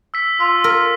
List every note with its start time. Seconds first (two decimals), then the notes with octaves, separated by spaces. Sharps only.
0.14 E6 B6
0.40 F4 E6
0.64 A#4 E6